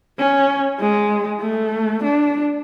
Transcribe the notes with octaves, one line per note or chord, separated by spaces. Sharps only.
C#4
G#3
A3
D4